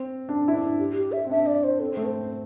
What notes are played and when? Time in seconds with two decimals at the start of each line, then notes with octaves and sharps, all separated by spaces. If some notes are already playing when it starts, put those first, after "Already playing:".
Already playing: C4
0.29 D4
0.48 E4
0.54 D4
0.79 G4
0.96 G4
1.12 E5
1.25 C4
1.30 D4 E5
1.47 D5
1.64 C5
1.80 C4 A4
1.92 C4
1.94 A3 A4
2.06 C5
2.14 C4